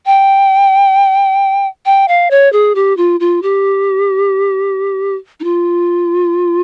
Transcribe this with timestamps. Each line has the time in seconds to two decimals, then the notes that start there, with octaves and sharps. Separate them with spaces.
0.06 G5
1.85 G5
2.08 F5
2.31 C#5
2.52 G#4
2.75 G4
2.97 F4
3.20 F4
3.42 G4
5.40 D#4
5.44 F4